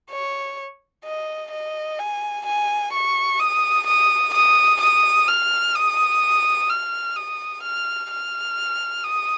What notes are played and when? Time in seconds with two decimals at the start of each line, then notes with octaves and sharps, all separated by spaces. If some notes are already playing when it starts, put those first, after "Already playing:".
0.11 C#5
1.04 D#5
1.51 D#5
1.99 G#5
2.46 G#5
2.93 C#6
3.40 D#6
3.87 D#6
4.34 D#6
4.81 D#6
5.28 F6
5.75 D#6
6.70 F6
7.16 D#6
7.63 F6
8.11 F6
9.04 D#6